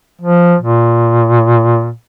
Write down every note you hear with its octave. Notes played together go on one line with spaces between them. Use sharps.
F3
A#2